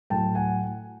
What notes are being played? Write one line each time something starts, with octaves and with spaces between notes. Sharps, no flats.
A2 F#3 A3 G5 A5
F#5 G#5